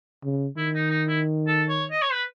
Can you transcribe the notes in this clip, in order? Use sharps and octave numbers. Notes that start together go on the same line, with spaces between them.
C#3
D#3 E4
D#4
D#4
E4
A4
C#5
D#5
C#5
B4